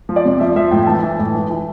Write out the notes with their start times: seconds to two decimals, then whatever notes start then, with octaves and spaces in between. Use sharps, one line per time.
0.09 F3
0.16 D5
0.25 C3
0.40 F3 E5
0.56 F3 E5
0.71 A2 G5
0.87 E3 A5
1.03 E3
1.19 A2
1.34 E3
1.50 E3